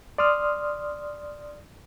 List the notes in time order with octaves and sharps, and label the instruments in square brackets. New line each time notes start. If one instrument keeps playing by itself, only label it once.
[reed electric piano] D5 C6 D#6 F6